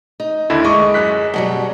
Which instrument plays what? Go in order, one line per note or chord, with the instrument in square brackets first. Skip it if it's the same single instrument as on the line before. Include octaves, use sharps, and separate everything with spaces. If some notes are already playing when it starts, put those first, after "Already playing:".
[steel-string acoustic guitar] D#4
[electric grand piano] D#2 D3 E4
[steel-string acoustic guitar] G#3 [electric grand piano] D#5 C#6 D6
[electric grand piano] F#2 F#6 B6
[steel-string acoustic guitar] B2 F#3 G3